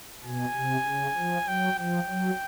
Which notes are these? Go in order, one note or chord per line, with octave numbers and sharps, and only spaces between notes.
B2 G#5
C3
C#3
F3
F#3 G5
F3 G5
F#3